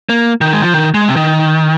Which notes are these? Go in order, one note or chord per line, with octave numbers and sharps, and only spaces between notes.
A#3
D#3
G#3
F3
D#3
G#3
C3
D#3